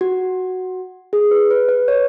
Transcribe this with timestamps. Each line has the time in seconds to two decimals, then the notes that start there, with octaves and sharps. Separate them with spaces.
0.01 F#4
1.13 G#4
1.31 B4
1.51 B4
1.69 B4
1.88 C#5